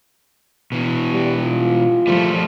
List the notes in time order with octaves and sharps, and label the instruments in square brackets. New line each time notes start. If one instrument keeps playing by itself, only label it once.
[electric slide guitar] B2 E3
[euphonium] G3
F4
[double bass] F3 [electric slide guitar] G3 A3